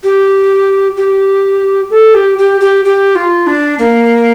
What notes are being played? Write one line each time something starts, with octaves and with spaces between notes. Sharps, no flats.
G4
G4
A4
G4
G4
G4
G4
F4
D4
A#3